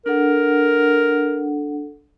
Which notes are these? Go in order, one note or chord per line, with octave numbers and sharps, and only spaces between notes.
D4 A4 A#4 F#5